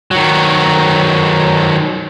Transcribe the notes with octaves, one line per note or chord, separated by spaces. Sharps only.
D#3 F#3